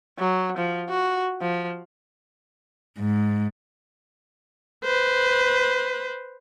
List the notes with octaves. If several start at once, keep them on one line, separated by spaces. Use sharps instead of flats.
F#3
F3
F#4
F3
G#2
B4 C5